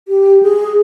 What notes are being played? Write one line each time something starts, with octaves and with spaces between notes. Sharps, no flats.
G4
G#4